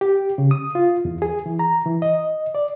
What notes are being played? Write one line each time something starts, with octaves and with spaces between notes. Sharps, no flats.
G4
C#3
D#6
F4
E2
G#4
E3
A#5
E3
D#5
D5